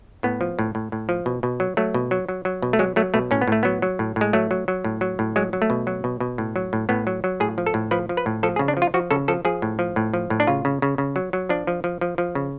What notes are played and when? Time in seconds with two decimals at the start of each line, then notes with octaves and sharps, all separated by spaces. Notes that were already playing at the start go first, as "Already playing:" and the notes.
0.23 A2 B3
0.41 F3
0.59 A2
0.75 A2
0.92 A2
1.09 F3
1.26 B2
1.43 B2
1.60 F#3
1.77 F#3 A3
1.94 B2
2.11 F#3
2.29 F#3
2.45 F#3
2.62 B2
2.73 A3
2.79 F#3 G#3
2.96 F#3 A3
3.14 B2 A3
3.31 A2 C#4
3.41 B3
3.48 A2 A3
3.63 F#3 B3
3.82 F#3
3.99 A2
4.16 A2 G#3
4.33 F#3 A3
4.51 F#3
4.68 F#3
4.84 A2
5.01 F#3
5.19 A2
5.36 F#3 G#3
5.53 F#3
5.62 A3
5.70 B2
5.87 F#3
6.04 B2
6.20 B2
6.38 A2
6.56 F#3
6.73 A2
6.89 A2 B3
7.07 F#3
7.24 F#3
7.40 A2 G#4
7.58 F3
7.66 A4
7.74 A2
7.91 F3 B4
8.09 F3
8.17 B4
8.26 A2
8.43 F3 A4
8.56 G#4
8.59 C#3
8.68 D4
8.77 F3
8.82 F4
8.94 F3 F#4
9.11 C#3 A4
9.28 F3 A4
9.45 F3 G#4
9.62 A2
9.79 F3
9.96 A2
10.14 F3
10.30 A2
10.40 D4
10.47 C#3 F4
10.65 C#3
10.82 C#3
10.98 C#3
11.16 F#3
11.33 F#3
11.49 F3 D4
11.67 F3
11.84 F3
12.01 F3
12.18 F3
12.35 C#3